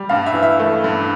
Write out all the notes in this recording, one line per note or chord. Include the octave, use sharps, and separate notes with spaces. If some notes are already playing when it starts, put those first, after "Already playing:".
Already playing: G3
G2 F5
E5
E3
E5
A3
G2